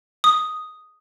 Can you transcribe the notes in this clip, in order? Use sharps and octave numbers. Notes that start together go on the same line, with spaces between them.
D#6